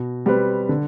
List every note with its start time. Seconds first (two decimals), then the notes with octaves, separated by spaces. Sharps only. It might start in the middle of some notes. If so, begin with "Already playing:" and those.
Already playing: B2
0.26 G3 C4 G4 B4
0.69 D3